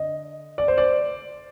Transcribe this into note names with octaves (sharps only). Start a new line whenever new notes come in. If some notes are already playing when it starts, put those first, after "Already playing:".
Already playing: D3 D#5
D5
C5
D5